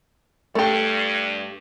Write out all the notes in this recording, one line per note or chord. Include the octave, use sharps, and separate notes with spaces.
G2 A3 G4